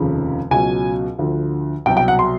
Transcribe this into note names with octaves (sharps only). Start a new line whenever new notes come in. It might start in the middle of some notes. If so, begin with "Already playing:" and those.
Already playing: F1 D#2 C#3 F3
C#2 B2 F#3 G#5
D2 D3 F3
C2 B2 F#3 G5
G5
F#5
C6